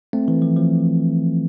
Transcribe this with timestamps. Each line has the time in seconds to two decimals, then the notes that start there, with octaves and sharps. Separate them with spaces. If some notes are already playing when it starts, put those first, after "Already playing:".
0.13 A3 C4
0.28 E3
0.42 F3
0.56 F3